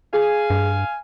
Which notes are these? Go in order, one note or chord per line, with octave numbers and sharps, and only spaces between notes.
G#4 F5 G#5
G2